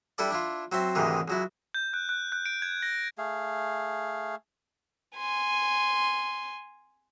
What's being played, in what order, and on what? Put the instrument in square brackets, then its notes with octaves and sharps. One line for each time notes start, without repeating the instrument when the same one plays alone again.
[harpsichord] G3 D4 E4 A4 D5
D4 E4 F4
F#3 C4 E5 C6
D2 G#2 C3 D#3 E3
C#2 F#3 E4
[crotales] G6
F#6
F#6
F#6
D7
G#6
A#6
[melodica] A3 G#4 F5
[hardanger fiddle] G#5 C6